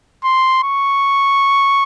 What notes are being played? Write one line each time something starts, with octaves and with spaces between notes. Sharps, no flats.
C6
C#6